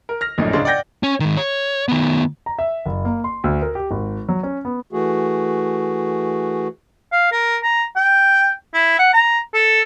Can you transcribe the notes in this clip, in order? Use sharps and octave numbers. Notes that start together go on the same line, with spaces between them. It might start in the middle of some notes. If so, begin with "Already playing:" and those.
A#4
F6 A#6
A#1 F#2 A2 D4 D#5
C#2 G#2 C#3 D4 C6
D5 F#5 G5 G6 A#6
C#4
G#2 D#3
C#5
D#3 B3
A#5
E5
F#1
A#3
C6
D2
A#4
G4
G#1
F#3
C#4
B3
E3 A3 F#4 G#4
F5
A#4
A#5
G5
E4
F#5
A#5
A4